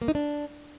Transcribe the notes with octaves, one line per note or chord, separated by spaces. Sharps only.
A#3
D#4
D4